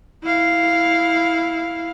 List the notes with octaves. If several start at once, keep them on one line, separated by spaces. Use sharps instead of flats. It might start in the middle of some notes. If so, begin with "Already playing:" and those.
E4 F5